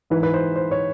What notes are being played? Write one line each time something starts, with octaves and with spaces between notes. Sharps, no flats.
G#2 E3 B4
B4
C5
C5
C#5